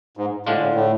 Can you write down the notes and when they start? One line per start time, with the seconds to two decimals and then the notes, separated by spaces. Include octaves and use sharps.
0.17 G#2
0.46 A2 D3 G#3 D4 F4
0.61 A2
0.74 A2